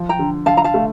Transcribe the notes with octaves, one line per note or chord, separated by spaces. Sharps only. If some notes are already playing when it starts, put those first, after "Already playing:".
Already playing: F3
G5 A#5
D3
D3 F5 A5
A#5
F5 A5
A3